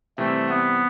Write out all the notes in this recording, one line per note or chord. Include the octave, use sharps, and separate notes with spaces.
C3 E3 G3 A3 C4
B3